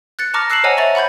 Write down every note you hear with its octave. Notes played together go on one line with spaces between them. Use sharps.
F#6 A6 C#7
A5 A#5 C#6 D6 F6 A#6
E6 F#6 C7 C#7 E7 F#7
C5 C#5 D#5 F#5 G#5 A#5
E5 C#6 A6 F7
F#5 B5 C#6 G6 G#6